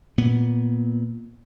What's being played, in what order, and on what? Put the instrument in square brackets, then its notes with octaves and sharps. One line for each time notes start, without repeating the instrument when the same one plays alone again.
[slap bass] A#2 B3